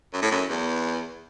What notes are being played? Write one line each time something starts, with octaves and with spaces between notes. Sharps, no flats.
F#2
A2
F#2
E2